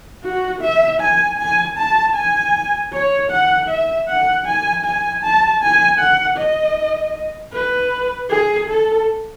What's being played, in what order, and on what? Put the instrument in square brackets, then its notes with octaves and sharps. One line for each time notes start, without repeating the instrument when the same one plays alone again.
[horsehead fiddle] F#4
E5
G#5
G#5
A5
G#5
C#5
F#5
E5
F#5
G#5
G#5
A5
G#5
F#5
D#5
B4
G#4
A4